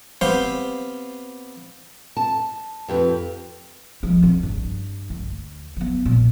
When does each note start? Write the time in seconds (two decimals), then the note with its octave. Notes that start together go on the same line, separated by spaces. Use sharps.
0.21 B3 C4 G4 C5 F5
2.17 A5
2.88 F2 G4 B4
4.03 F3 G#3
4.22 A1 C4
4.43 G2
5.10 D2
5.76 F#3 B3
6.05 A#2